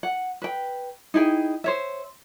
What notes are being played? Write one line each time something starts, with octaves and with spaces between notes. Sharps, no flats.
F#5
B4 G5
D#4 E4 G#4 G5
C5 C#5 E5